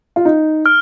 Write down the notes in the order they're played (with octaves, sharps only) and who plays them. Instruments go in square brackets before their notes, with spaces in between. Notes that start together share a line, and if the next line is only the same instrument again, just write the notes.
[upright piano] F4
D#4
[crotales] F6